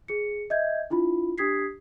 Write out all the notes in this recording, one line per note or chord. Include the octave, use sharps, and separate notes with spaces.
G#4 C#7
D#5 E5 G6 G#6
D4 E4 F4 B5
D4 G4 D#6 G#6 B6 C7